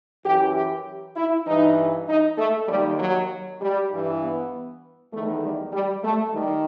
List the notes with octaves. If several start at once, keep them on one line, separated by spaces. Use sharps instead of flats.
F#2 E3 G4
G4
E4
G2 E3 D#4
D#4
A3
D#2 D#3 G3
F#3
G3
G2 E3
B3
E2 D#3 A3
G3
G3
A3
D#3 G3